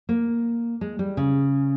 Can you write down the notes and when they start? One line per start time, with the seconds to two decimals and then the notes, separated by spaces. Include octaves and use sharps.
0.09 A#3
0.81 G#3
0.99 G3
1.17 C#3